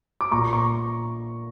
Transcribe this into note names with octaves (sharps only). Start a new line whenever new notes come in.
D6
A#2 A#5 C#6
A#5 C#6